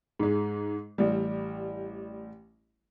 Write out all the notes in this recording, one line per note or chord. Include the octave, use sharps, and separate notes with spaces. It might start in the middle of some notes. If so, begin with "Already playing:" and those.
G#2 G#3
A1 G3